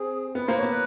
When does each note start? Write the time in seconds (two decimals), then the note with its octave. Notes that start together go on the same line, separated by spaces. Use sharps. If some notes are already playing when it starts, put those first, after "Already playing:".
Already playing: C4 G#4
0.35 B3 B4
0.45 A#3 C5
0.57 C#5
0.63 B3
0.69 B4